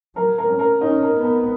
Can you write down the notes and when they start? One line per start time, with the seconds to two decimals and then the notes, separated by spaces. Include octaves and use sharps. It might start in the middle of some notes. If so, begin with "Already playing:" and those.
0.16 F#3 A#4
0.38 A#4
0.49 C#4
0.59 A#4
0.80 C#4 D#4
1.03 A#4
1.13 B3
1.23 A#4